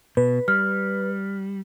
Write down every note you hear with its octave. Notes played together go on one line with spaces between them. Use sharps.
B2 B4
G3 F6